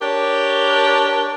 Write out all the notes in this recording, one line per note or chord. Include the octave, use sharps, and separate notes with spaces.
D4 G4 A#4 C#5